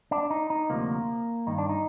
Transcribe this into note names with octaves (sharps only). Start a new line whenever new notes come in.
D4
D#4
D#4
D2 C3 F3 A#3
G2 D#3 D#4
D4
D#4